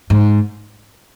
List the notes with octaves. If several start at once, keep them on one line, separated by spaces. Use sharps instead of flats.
G#2